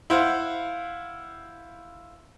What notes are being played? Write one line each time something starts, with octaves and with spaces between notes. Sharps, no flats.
E4 C5 F5 F#5